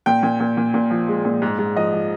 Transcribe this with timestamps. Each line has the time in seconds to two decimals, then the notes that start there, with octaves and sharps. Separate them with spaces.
0.06 A#2 G5
0.23 A#2
0.40 A#2
0.57 A#2
0.74 A#2
0.90 F3
1.08 G#3
1.25 A#2
1.42 G#2
1.59 G#2
1.76 F3 D#5
1.93 F3